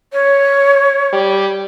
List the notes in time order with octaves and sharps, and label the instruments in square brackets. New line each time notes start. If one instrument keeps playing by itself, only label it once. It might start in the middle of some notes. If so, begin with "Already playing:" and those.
[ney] C#5
[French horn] G3